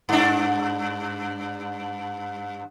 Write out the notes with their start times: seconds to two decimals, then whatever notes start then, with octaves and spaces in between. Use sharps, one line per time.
0.09 G2 D4